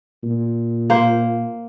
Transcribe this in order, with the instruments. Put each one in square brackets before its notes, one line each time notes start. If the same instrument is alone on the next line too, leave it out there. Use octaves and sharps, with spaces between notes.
[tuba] A#2
[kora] A#3 C5